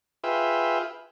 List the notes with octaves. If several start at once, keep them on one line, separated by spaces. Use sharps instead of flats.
F4 G#4 B4 E5 G5